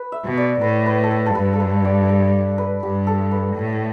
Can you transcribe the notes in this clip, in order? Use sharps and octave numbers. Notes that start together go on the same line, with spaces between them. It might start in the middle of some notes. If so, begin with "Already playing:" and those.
Already playing: B4
E5
B2
D5
A2 B4
B4
A4
B4
A4
G2 B4
A4
B4
D5
B4
B4
G2 G4
A4
B4
A2